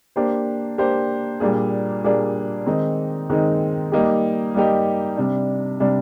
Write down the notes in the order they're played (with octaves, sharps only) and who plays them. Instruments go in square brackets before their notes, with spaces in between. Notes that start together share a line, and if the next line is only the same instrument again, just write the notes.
[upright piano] A#3 D4 G4 C5
A#3 D4 G4 C5
A#2 G3 A#3 D4 G#4
A#2 G3 A#3 D4 G#4
D#3 G#3 C4 D#4
D#3 G#3 C4 D#4
G3 A#3 D#4 G4
G3 A#3 D#4 G4
C3 G3 D4
C3 G3 D4